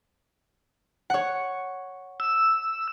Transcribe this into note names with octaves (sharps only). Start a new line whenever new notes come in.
C#5 F#5
E6